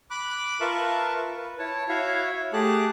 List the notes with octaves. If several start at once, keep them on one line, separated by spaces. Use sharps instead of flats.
B5 D6 F#6
F4 A#4 B4 E5 A5 C#6
B4
E4 C#5 A5
E4 F#4 C#5 E5 F5
A3 G4 G#4 A5 F#6